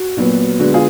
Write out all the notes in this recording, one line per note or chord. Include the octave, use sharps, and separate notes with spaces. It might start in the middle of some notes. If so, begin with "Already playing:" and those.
Already playing: F#4
A#2 F#3 B3
D3 G#3 B3 F#4
F4 G#4